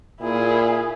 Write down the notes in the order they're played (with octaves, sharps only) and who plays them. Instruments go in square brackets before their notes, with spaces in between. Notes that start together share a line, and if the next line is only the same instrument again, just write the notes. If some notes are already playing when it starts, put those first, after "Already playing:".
[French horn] A#2 [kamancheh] E4 G#4